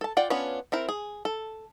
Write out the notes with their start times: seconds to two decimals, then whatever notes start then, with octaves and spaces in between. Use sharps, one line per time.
0.01 A4 A5
0.17 F4 D5 F#5 G5
0.30 B3 C#4 D4 F4 C#5
0.72 C4 E4 A#4
0.89 G#4
1.25 A4